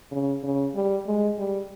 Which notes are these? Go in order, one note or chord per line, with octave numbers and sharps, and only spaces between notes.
C#3
C#3
G3
G#3
G3